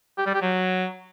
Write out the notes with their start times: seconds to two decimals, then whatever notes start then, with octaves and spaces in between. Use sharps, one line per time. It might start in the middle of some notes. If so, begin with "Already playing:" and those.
0.18 G4
0.26 G3
0.34 G4
0.42 F#3